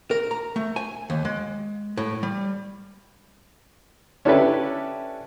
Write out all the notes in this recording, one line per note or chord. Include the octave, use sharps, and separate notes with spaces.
A#4
A#5
A3
G#5
D#2
G#3
A2
G3
C#4 D4 E4 G4 A4 B4